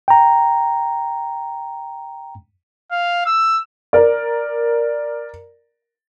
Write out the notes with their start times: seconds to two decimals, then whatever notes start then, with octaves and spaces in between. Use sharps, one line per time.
0.08 G5 A#5
2.91 F5
3.26 E6
3.93 A#4 D5